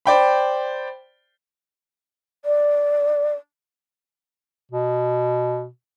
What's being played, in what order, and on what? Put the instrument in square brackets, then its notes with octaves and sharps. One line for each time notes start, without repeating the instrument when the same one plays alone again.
[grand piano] C5 D5 G5 B5
[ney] D5
[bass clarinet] B2